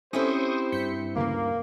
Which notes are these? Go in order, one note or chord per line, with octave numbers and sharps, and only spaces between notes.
C4 C#4 E4 G4 A4 C5 C#6 D#6
G2 G6 B6 C#7
D2 C#3 E3 A#3